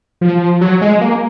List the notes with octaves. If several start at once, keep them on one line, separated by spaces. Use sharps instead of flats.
F3
F#3
G#3
A#3